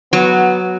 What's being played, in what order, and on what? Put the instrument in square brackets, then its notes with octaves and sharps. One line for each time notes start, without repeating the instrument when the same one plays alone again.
[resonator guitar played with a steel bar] F#3 [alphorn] B3